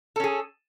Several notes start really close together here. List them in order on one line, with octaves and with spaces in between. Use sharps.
A4 C#4 G#4